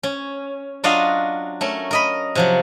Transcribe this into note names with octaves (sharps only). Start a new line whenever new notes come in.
C#4
F#3 D4 F4 F#4 D#5 F5
A3 C#4 A#4
A#4 D#5 B5
C3 F3 F#3